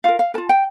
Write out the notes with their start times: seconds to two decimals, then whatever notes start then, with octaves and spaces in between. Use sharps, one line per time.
0.04 F4 A#4 F5
0.19 F5
0.34 F4 A#4 A5
0.49 G5